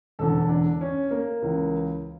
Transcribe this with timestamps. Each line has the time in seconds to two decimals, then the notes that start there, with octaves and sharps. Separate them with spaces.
0.19 E1 E2 D3 A4
0.49 D4
0.81 C#4
1.11 A#3
1.42 C#2 C#3 E3